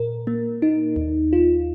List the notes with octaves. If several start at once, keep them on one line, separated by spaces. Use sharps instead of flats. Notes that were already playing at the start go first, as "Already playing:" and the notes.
Already playing: A#2 A#4
A#3
D#4
D#2
F4